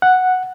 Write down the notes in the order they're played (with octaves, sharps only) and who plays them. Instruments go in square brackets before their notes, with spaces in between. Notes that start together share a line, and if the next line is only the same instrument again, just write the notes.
[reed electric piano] F#5